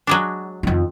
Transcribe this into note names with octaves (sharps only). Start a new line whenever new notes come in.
F#3 G#3 D4
F2 D#3